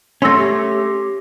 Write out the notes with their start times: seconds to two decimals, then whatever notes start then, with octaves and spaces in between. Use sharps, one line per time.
0.22 A3 C#4 C6 E6 A#6
0.36 G4